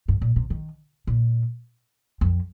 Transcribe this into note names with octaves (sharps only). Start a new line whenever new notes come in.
G2
A#2
C3
D#3
A#2
F2